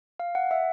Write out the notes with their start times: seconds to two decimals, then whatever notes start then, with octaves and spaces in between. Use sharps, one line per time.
0.20 F5
0.35 F#5
0.51 E5